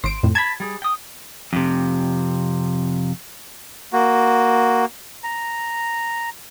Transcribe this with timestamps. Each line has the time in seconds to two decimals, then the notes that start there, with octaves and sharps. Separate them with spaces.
0.04 G#1 C5 D7
0.23 F2 A2
0.35 A5 B5 G#6
0.60 G3 G#4
0.82 G5 D#6
1.53 F2 C3
3.93 A#3 F#4
5.24 A#5